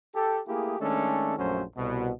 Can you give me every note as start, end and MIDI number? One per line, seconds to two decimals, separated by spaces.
0.14 0.40 67
0.14 0.40 69
0.47 0.79 57
0.47 0.79 58
0.47 0.79 64
0.47 0.79 67
0.47 0.79 68
0.79 1.36 51
0.79 1.36 56
0.79 1.36 57
0.79 1.36 61
0.79 1.36 62
0.79 1.36 69
1.38 1.63 34
1.38 1.63 42
1.38 1.63 54
1.38 1.63 57
1.38 1.63 61
1.38 1.63 72
1.76 2.10 36
1.76 2.10 47